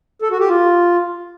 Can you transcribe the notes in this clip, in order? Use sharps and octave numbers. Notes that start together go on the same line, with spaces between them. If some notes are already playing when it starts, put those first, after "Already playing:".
A4
F#4
G4
F4